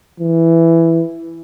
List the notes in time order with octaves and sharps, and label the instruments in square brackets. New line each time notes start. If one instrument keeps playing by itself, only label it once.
[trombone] E3